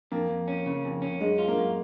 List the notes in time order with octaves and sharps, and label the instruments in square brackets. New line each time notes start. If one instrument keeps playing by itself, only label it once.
[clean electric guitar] F2 [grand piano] A#3
[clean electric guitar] F2
C#4
C#3
F2
C#4
[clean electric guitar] F#2 [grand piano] G#3
[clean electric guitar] F4
[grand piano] A#3
[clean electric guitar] F#2